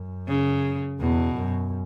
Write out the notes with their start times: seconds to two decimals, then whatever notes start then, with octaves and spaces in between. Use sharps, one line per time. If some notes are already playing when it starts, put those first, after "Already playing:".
Already playing: F#2
0.28 C#3
1.00 E2 B2
1.35 F#2